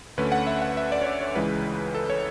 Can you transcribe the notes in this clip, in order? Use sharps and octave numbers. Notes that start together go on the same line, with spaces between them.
D2 D3 A3 C#4 B4
F#5
E5
F#5
E5
D5
C#5
D5
C#5
C#2 C#3 E3 G#3 B4
A4
C#5